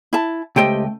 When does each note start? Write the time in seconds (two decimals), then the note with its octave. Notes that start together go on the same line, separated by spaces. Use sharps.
0.13 E4 A5
0.56 C#2 A3 G4 C5 D#5 G5